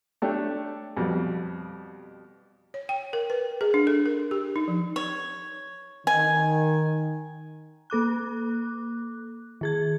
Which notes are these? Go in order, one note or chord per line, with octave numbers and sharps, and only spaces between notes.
A3 D4 G4 C#5
F2 B2 G3
C#5
G5
A#4
B4
G#4
D4
A4
A#4
G4
D#4
F3
C#5
D#3 G#5
A#3 A4 D6 F#6
D#3 G#4 G#6